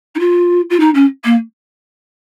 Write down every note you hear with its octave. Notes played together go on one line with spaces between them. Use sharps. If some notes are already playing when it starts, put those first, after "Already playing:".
D#4
F4
F4
D#4
C#4
A#3